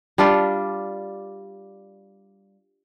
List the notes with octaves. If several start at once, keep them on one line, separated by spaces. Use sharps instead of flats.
G3 D4 F4